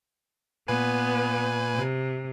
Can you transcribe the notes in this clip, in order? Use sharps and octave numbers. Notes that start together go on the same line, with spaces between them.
A#2 B3 B4 G#5
C3